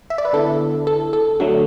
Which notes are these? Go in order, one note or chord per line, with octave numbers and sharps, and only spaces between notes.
E5
D5
B4
D3 B3 E4 A4
A4
A4
D3 F#3 A3 F#4